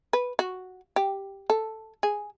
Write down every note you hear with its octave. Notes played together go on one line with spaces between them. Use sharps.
B4
F#4
G4
A4
G#4